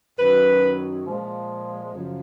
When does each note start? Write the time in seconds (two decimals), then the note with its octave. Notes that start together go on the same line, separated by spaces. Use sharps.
0.19 F#2 D#3 F#3 B4
1.06 A#2 F3 G#3
1.94 F#2 C#3 F3